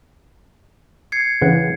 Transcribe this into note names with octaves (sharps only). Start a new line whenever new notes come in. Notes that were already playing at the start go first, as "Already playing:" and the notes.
G#6 C7 C#7
C#3 E3 F#5